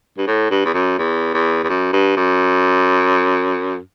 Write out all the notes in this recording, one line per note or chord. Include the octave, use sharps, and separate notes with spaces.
G2
A2
G2
E2
F#2
E2
E2
E2
F#2
G2
F#2